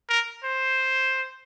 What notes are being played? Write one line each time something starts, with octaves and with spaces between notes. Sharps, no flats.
A#4
C5